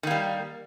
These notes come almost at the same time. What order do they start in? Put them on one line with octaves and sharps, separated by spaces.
D#3 A#3 G3